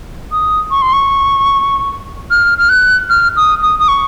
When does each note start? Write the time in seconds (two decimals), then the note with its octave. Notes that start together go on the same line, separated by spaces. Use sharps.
0.31 D#6
0.71 C#6
0.82 C6
0.93 C#6
2.31 F6
2.58 F6
2.69 F#6
3.10 F6
3.36 D#6
3.62 D#6
3.79 D#6
3.88 C#6